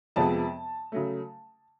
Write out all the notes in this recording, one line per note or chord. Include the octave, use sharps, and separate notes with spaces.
F2 C3 F3 G#3 B3 A5
C#3 F#3 A3